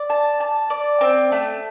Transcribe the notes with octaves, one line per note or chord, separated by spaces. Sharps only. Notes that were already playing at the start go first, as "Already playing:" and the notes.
Already playing: D5
A5
A5
D5
C4
A3